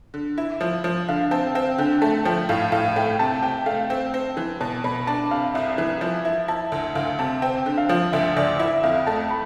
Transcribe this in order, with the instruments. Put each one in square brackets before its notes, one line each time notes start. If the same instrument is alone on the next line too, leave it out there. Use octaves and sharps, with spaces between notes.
[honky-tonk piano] D3
E4
F3
F3
[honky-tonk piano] D3 [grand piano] F5
[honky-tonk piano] C4 [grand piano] A5
[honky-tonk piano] C4 [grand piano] F5
[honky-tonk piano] D3 [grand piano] G5
[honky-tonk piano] A3 [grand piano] A5
[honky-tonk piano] F3 [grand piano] G5
[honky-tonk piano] A2 [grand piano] F5
[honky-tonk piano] A2 [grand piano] F5
[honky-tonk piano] A3 [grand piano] G5
[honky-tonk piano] C3 [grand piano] A5
[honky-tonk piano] C3 [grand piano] G5
[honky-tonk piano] A3 [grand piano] F5
[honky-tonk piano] C4
C4
E3
[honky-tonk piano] B2 [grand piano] A5
[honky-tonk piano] B2 [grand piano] B5
[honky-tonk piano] D4 [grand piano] A5
[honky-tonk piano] C3 [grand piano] F5
[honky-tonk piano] C2 [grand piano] E5
[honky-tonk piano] E3
[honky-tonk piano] F3 [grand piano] E5
[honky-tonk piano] E4
[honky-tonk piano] E4 [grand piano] A5
[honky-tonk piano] D2 [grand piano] E5
[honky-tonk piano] D2 [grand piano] F5
[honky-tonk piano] C3 [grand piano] A5
[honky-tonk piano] C4 [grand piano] G5
[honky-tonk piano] D3
[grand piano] F5
[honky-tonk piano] F3
[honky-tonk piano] D2 [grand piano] E5
[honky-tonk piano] D2 [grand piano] D5
[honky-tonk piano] E4 [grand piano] E5
[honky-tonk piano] F2 [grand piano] F5
[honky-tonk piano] A3 [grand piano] A5
[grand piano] B5